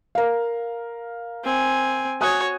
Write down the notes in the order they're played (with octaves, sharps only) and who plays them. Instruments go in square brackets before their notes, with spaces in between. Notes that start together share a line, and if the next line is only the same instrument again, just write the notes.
[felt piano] A#4 F5
[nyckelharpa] C4 G#5
[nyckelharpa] F#4 C#5 [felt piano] G#5 D#6 F#6